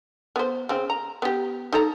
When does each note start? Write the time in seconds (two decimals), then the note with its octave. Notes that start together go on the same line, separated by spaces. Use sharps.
0.36 B3 C5
0.69 C#3 C4
0.90 A#5
1.22 B3 G4
1.73 D#4 A4 A#5